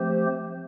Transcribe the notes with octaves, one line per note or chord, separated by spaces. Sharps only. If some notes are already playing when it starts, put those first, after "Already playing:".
Already playing: F3 A3 C4 G4 C5